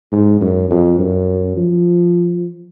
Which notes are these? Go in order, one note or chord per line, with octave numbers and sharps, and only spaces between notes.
G#2
F#2
F2
F#2
F3